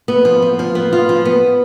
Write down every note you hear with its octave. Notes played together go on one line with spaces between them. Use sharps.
B3
F3
B3
F3
B3
F4
F3
B3